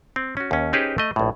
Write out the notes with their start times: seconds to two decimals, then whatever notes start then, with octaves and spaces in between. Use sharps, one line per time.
0.16 C4
0.37 C#4 F#4
0.51 D#2 C#4
0.73 C#4 D#4 G4 G#4 B4 C5
0.98 A3 D#5
1.16 A#1 A2